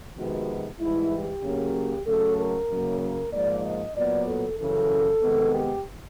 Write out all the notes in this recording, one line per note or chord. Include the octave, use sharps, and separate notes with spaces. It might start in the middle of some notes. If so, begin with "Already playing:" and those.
F2 C3 D#3 G#3 B3 F#4
G#2 E3 G3 E4
G4
C#3 F#3 A#3
C#3 F#3 A3 A4
A#4
F#2 C#3 F#3 A#3
A#4
G#2 F3 A#3 D5
D#5
A#2 F#3 B3 D5
A4
F#2 C#3 E3 A4
C3 D#3 G#3 B3
G4